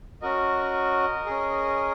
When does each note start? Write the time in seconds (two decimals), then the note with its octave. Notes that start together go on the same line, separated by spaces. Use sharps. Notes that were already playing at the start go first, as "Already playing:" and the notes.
0.22 C#4 F#4 A#4 D#5
1.26 C#4 G#4